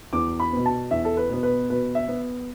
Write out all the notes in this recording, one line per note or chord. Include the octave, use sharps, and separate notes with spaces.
E2 D6
B5
B2 B3
A5
E2 E5
A4
B4
B2 B3
B4
B2 B4
E5
B3